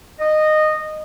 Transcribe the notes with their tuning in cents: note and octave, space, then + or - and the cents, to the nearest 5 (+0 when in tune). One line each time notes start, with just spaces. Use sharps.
D#5 -15